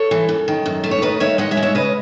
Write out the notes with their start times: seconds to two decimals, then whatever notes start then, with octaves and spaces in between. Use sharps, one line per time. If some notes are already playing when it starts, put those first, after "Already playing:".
Already playing: A4 C#5
0.11 E3
0.29 F#2
0.48 D#3
0.66 F#2
0.84 A3
0.91 C#5
1.02 D#3 B4 D#5
1.20 D#3 C#5 E5
1.38 G#3 D#5 F#5
1.51 C#5 E5
1.57 G#3
1.63 C#5 E5
1.75 C#3 B4 D#5